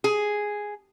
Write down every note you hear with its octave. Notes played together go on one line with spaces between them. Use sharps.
G#4